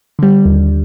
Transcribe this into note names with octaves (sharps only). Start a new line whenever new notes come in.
D3 G3
D#2